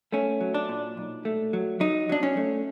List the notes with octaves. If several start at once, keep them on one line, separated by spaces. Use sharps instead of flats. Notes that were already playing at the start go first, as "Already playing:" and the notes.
A3 C#4
F#3
D4
A#2
B1
A3
F#3
F#3 D#4
F#3 D4
C#4
A3